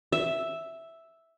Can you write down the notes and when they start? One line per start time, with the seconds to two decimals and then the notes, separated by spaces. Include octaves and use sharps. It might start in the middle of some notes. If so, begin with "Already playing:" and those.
0.12 E5